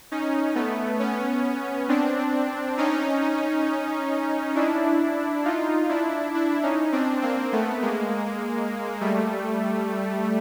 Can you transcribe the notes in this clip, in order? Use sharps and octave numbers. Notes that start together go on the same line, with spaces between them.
C#4 D#4
A3 B3
B3 C#4
C4 D4
C#4 D#4
D4 E4
D#4 F4
D4 E4
D4 E4
C#4 D#4
C4 D4
A#3 C4
A3 B3
G#3 A#3
G3 A3